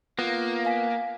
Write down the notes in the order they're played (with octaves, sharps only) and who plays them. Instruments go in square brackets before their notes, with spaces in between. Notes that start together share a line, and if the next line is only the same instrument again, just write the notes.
[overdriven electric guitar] A#3 [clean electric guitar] B3 [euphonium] F4 [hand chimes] A#6
[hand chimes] F5 G#5 B6